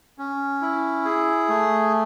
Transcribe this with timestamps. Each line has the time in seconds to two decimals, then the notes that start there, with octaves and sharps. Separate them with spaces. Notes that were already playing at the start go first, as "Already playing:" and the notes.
0.18 C#4
0.61 E4
1.05 G#4
1.49 A3